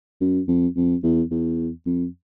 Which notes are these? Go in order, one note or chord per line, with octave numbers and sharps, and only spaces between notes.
F#2
F2
F2
E2
E2
F2